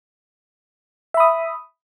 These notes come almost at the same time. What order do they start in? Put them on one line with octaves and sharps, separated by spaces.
E5 B5 D#6